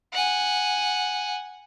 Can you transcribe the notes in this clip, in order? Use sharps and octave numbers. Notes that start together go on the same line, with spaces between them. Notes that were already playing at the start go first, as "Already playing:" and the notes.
F#5 G#5